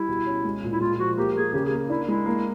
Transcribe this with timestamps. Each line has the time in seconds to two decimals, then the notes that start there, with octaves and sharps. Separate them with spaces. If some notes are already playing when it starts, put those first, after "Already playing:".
Already playing: G3 E4
0.08 B2
0.26 C#4
0.45 G#3
0.63 A#2
0.72 E4
0.80 G#3 F4
0.99 F3 F#4
1.17 A#3 G4
1.35 A#3 G#4
1.53 C#3 G4
1.65 G#4
1.71 A#3
1.89 D4 E4
2.08 G#3 E4
2.26 A#3